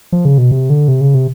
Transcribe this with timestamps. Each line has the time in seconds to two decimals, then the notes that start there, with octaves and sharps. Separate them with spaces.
0.12 F3
0.25 C#3
0.38 B2
0.51 C3
0.70 D3
0.88 C3
1.01 C#3
1.14 C3